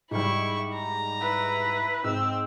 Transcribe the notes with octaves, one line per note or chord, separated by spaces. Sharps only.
G#2 G3 E4 C#6
A#5
E4 B4
G#2 C4 E6